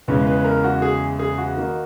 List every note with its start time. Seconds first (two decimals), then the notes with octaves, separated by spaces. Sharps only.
0.08 E2 C#3 G#3 C#4 B4
0.27 B4
0.45 A#4
0.64 F#4
0.82 G#4
1.19 G#4
1.38 F#4
1.56 D#3 A#3 D#4